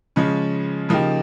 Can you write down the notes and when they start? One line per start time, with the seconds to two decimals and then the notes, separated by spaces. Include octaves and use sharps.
0.16 C#3 F3 G#3 C#4
0.89 C#3 F3 A#3 D#4 G4